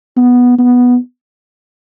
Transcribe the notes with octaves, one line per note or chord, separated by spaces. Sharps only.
B3
B3